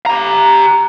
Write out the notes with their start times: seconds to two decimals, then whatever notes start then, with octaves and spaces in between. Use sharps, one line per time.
0.06 G4 A#5